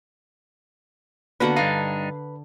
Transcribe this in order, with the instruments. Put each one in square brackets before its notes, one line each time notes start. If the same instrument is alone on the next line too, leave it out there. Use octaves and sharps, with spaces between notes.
[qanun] D3 F#5 [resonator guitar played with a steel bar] A#3 B3 F#4 [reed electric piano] B4 B5
[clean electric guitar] G2 D4 D#4 [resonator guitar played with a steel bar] F5